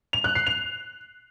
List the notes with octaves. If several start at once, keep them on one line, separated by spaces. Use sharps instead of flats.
F7
F#6
C7
F7